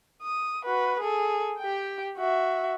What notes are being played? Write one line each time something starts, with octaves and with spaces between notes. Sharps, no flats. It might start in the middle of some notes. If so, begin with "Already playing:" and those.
D#6
F#4 B4
G#4 A4
G4 G5
F#4 E5